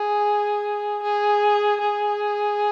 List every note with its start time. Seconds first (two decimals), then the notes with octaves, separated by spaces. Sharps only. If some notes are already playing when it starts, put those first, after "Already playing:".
Already playing: G#4
1.03 G#4
1.81 G#4